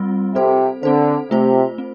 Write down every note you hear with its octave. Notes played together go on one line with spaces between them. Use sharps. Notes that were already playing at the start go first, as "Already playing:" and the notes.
Already playing: G3 C4 F4
C3 C4 A4 C5
D3 C4 A4 C5
C3 A3 F4 C5
C4